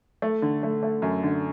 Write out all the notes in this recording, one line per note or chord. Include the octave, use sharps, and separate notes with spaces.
A3
D3
A3
A3
F#2
D3